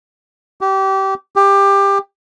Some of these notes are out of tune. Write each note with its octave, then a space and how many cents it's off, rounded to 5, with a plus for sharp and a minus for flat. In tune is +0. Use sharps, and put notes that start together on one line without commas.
G4 -25
G4 +20